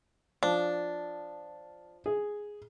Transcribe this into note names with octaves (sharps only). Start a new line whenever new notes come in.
F3 D4
G#4